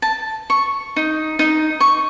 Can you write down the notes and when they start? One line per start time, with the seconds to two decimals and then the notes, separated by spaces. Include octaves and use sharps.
0.02 A5
0.50 C#6
0.96 D#4
1.39 D#4
1.80 C#6